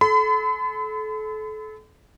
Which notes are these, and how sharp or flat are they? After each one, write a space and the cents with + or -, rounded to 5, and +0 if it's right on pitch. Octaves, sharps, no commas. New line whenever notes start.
A4 -30 B5 +45